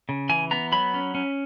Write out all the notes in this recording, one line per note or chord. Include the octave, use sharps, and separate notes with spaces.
C#3
E3 G#5
B3 A#5
F#3 B5
C#4
C#4